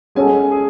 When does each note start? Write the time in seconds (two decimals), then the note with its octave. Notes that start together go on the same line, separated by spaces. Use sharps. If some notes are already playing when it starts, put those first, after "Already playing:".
0.15 G#3 C#4 F#4 A4 G#5
0.52 G#4